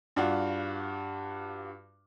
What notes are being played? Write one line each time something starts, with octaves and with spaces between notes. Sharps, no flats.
G2 D4 F4 F#4